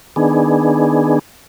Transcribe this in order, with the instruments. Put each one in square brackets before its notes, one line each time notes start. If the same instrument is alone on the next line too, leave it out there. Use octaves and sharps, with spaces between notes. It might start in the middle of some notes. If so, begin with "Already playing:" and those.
[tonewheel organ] D#3 B3 D4 G#4